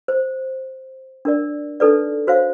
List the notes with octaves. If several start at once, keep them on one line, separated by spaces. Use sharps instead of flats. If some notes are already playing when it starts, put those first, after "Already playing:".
C5
D4 A#4 D5
D4 D#4 A4 B4 D5
F#4 C5 C#5 F5